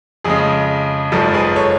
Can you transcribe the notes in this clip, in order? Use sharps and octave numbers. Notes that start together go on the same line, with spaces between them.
F2 C#3 G#3 G#4
G#1 F#2 F3 G#3 A4
G#4 B4
A4 C#5